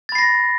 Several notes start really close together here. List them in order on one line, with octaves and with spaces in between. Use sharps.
A6 B5 C7 A#6